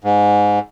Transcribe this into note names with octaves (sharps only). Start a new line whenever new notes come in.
G#2